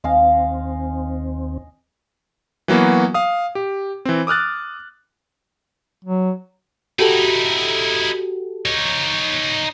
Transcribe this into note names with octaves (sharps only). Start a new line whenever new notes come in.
D#2 C4 D#5 F5 G#5
E3 F#3 A#3 B3 F#4
F5 D#6
G4
E3 C4
D6 D#6 F6 F#6 A6
F#3
D#4 E4 F#4 G4 A4
D#4 C#5